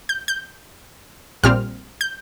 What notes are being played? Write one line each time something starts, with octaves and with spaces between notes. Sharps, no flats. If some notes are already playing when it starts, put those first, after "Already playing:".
G6
G6
A#1 A#2 G3 C4 F6
G6